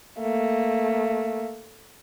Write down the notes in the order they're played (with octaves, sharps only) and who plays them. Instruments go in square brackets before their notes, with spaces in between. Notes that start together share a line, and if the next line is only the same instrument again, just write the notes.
[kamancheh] A3 A#3